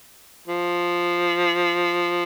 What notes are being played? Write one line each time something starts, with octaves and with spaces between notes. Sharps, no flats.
F3